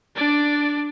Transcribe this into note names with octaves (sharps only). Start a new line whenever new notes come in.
D4 D5